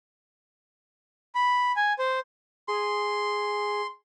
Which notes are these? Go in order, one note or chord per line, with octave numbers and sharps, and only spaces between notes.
B5
G#5
C5
G#4 C6